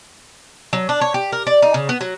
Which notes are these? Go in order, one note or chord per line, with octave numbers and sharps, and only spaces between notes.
F#3
D4
C#5
G4
A#4
D5
D#4
C#3
B3
F#3